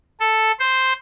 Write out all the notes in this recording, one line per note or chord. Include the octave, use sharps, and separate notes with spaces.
A4
C5